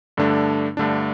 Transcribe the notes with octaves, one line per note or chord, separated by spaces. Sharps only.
G2 D3 A3 D4
G2 D3 A3 D4